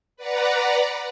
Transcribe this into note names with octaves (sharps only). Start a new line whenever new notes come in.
B4 D5 F#5 A#5